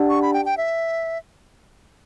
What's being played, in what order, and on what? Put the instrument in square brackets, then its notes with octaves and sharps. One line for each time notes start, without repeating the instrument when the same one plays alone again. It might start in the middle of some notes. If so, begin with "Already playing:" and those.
Already playing: [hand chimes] D4 G4 D5 F#5 A5
[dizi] C#6
B5
G5
G5
E5